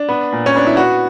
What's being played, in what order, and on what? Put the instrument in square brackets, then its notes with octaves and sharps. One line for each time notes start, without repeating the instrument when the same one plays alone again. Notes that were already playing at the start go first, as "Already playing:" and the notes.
Already playing: [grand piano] D4
B3
A#2
C#4
B3 D4
E4
B3 F#4